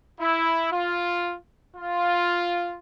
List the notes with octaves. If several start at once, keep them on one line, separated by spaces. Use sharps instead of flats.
E4
F4
F4